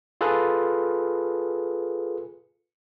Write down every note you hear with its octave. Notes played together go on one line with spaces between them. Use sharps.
F4 G#4 A4 B4